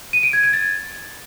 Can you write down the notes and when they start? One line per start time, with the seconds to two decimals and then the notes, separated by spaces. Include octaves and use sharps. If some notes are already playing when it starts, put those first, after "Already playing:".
0.13 D#7
0.23 D7
0.33 G#6
0.43 G#6
0.53 A6